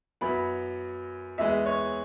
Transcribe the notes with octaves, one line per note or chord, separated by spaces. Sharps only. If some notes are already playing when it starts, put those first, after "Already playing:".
F#2 F#3 B3 E4 B5
E2 E3 G#3 E5
C#5